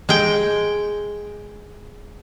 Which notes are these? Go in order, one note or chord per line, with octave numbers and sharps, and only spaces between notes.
G#3 G5